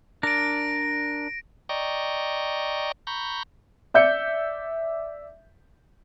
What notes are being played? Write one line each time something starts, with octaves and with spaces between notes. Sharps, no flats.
D4 A#4 D5 A#6 D7
D5 D#5 G5 A#5 C#6
A#5 B5 C#6 G6
D5 E5 G6 C#7